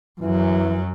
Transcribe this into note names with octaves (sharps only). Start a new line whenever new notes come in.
F#2 E3 F#3